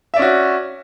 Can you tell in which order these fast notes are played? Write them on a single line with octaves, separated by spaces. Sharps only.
E5 D5 C#4 F#4